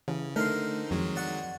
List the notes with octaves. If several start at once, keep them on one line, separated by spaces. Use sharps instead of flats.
C#3 E3
D3 A3 D#4 A#4 C5
F2 D#3 F#3 G#3
D5 F#5 C#6